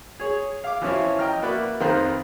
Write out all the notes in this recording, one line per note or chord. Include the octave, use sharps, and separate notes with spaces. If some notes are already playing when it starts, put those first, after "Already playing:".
G#4 C#5
F5 D6
E3 F3 C#4 E4 F4
D#5 G5 A#5 F6
A#3 F#4 B4 D5 E5
F2 D#3 F4 B4 C5 A#5